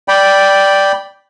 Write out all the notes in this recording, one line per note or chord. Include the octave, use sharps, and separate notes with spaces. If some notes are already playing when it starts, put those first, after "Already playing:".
D5 G5 B5